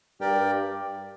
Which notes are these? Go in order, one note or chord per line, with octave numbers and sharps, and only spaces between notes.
G2 G4 A#4 D5 G5